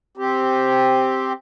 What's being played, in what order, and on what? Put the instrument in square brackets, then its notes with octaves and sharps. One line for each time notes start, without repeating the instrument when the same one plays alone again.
[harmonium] C4 G4